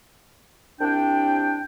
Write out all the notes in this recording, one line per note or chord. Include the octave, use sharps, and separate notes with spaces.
C2 D4 G5